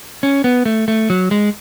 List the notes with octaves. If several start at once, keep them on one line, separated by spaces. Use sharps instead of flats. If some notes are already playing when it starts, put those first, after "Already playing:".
C#4
B3
A3
A3
F#3
G#3